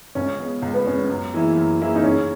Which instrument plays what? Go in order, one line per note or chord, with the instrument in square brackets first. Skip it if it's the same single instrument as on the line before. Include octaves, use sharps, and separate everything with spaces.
[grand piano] C#2 [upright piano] C#4
[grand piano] C#3 G#3 B3
C#2
[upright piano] B3
[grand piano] C#3 G#3 B3 [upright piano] C#4
[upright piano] C#4
[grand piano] F#2
E3 A#3 E4 G#4
F#2
E3 A#3 E4 G#4
[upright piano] D#4
[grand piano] C#3 [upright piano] C#4